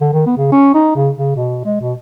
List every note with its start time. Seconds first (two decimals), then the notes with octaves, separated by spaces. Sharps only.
0.01 D3
0.13 D#3
0.26 B3
0.37 C#3
0.52 C#4
0.74 D#4
0.96 C#3
1.16 C#3
1.36 B2
1.65 G#3
1.81 B2